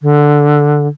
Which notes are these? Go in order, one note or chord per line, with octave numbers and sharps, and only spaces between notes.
D3